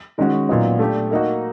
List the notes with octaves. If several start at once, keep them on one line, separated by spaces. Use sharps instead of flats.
D#3 G#3 C#4 F#4
A#2 F#3 B3 D#4
A3 D4 G4
A#3 D#4 F#4